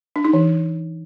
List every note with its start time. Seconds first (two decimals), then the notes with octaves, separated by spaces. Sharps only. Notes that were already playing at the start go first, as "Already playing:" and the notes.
0.16 D4
0.25 D#4
0.33 E3